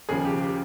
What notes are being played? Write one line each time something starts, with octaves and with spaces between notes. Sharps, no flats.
D#2 C#3 F3 G#4
G4
G4